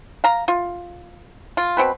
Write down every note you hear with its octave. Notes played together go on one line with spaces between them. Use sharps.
F5 A#5
F4
F4
B2 C4 B4